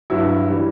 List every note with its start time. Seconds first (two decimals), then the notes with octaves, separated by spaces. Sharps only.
0.10 G2 F#3 E4
0.50 E3 G3